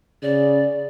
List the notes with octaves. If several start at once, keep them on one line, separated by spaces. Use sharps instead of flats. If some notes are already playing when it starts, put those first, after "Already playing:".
C#3 D5